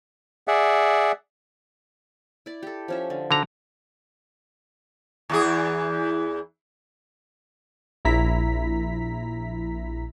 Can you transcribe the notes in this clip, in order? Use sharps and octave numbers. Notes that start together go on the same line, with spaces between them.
G#4 D5 E5 F#5
E4 D5
G4 A4
F3 C#4 E5
D3
D3 D#4 F#4 A#5
E2 E3 G#4
A#1 E4 A#5 B6